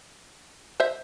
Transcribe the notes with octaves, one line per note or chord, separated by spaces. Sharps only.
C5 E5